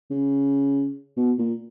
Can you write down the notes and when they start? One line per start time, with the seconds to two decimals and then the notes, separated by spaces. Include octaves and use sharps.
0.11 C#3
1.17 B2
1.39 A#2